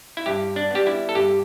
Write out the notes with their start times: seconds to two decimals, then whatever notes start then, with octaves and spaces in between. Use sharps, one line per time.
0.17 E4
0.26 G2 G4
0.56 D4
0.71 G3 B3 G4
0.87 E4
1.09 A4
1.15 G2 G4